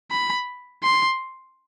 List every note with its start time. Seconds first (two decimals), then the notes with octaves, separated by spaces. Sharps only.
0.11 B5
0.83 C6